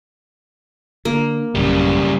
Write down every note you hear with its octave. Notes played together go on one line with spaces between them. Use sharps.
D3 A#3
A1 F#2 C#3 G3